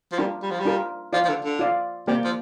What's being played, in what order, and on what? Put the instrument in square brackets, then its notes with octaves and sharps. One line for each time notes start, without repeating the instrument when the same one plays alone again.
[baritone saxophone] F3
[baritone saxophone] G3 [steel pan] D4 F4 A#4
[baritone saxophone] G3
F3
G3
[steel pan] D4 F4 A#4
[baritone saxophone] F3 [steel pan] F4 D5 F5
[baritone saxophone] F3
D3
D3
[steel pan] F4 D5 F5
[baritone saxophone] C3 [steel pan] A#3 G4 D5 G5
[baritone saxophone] F3